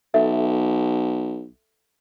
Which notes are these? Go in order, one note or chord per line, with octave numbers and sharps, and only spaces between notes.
B1 A4 E5